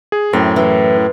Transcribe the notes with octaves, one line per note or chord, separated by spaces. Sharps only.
G#4
F#2 A2 C4
E3